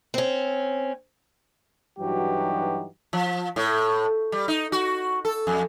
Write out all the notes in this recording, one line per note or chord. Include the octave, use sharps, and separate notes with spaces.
C4 C#4
G2 E3 F#3 D#4 F#4 G4
F3
A2
G3
D#4
F#4
A4
F2